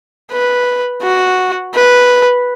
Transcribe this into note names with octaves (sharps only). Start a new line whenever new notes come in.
B4
F#4
B4